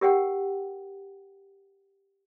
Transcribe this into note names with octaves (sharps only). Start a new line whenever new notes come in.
G4 A#4 F#5 G5